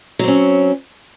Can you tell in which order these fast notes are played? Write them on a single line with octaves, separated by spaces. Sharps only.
F#3 C4 C#4